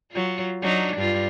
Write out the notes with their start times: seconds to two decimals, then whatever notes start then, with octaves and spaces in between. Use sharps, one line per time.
0.11 F#3 F4
0.62 F#3 D4 D#4
0.97 G2 F4